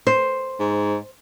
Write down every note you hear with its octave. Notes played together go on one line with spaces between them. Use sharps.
C5
G#2